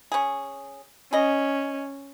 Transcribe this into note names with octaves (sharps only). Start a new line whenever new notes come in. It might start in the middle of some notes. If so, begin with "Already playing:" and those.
C#4 G#4
C#4 G#4 D#5